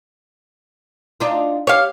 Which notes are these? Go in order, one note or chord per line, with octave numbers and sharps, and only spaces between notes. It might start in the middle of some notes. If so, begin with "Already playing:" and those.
D4 D#4 F4
G4 C#5 F5